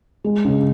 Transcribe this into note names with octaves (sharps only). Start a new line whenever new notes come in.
G#3
C#3